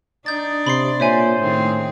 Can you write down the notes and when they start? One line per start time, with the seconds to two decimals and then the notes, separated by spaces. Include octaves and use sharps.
0.26 D4 D#4 D5 G6 A6
0.67 C3 B5 C6 C7
1.00 A#2 C5 C#5 E5 G#5
1.40 A2 D#3 C4 G#4